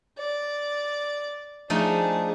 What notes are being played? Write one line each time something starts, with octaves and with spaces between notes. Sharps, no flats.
D5
F3 A3 D4 D#4 G#4